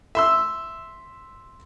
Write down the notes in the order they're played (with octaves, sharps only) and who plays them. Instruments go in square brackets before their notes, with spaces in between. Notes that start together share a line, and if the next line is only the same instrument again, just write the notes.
[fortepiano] E5 C6 E6